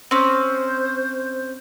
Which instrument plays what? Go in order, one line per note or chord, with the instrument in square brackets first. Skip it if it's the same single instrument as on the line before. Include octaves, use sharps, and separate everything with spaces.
[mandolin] C4 C#4 [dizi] C5